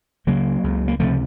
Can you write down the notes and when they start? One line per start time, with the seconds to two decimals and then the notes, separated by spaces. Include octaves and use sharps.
0.27 C#2 C#3 F#3 A#3
0.64 C#2 C#3
0.88 A#3
1.00 C#2 C3 F3 A3